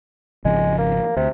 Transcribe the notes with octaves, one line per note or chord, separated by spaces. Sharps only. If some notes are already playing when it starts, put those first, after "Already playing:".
G#1 C#3 F3 G#3
A#3
D2 C3